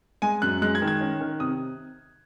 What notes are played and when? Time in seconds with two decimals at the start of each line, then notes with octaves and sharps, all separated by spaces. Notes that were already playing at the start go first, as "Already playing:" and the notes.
0.22 G#3 G#5
0.42 F#2 F#6
0.62 G#3 F#6
0.75 G#6
0.82 D#3
0.88 G#6
1.01 C#4
1.21 D#3
1.40 C3 D#6